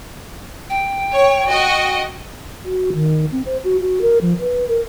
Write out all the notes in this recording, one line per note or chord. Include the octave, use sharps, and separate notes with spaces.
G5
C#5
F#4 D#5
F#4
D#3
C4
C5
F#4
F#4
A#4
F3
B4
A#4